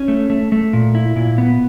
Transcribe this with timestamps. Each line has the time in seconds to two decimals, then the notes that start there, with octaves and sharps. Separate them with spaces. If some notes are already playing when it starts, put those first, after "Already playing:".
Already playing: C#4
0.08 A3
0.30 A3
0.52 A3
0.73 A#2
0.95 E4
1.16 A#2
1.38 B3